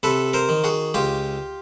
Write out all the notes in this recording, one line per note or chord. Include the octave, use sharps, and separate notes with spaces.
C3 A4 B4
A#4 C5
D#3
F#4 G#4
C#2 F4 G4